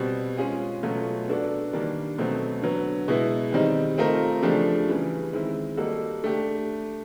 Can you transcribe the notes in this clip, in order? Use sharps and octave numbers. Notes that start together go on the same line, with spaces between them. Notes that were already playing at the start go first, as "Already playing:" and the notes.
Already playing: B2 G3 C4
G#3 C#4 F4 G#4
B2 F#3 A3 C#4 F4
B3 D4 F#4 A4 D5
D#3 G3 A#3 D4
B2 F#3 A3 C4
D3 F#3 B3
B2 G#3 B3 E4
D#3 G3 C4 D#4
A3 C4 F4 A#4 D#5
C#3 F3 A3 D4 G4
C#3 E3 G3
D#3 G#3 C4 E4
G3 A#3 D#4 F#4 A4
A3 D4 G4